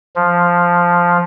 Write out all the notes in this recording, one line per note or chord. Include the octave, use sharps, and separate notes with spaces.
F3